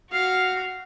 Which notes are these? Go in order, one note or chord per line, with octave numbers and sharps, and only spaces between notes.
F#4 F5